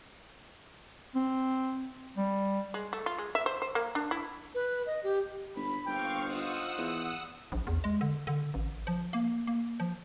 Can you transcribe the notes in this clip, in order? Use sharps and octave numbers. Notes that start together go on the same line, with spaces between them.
C4
G3
G#3
A3
F4
G#3
E5
C5
C5
A#3
D4
E4
B4
D#5
G4
G1 B5
G1 A#3 C4 F5 G5 C#6
D#4 F4 C5 F#5 D#6 E6
E2
A#1
E2
G#3
D3
D3
A1
F3
A#3
A#3
F3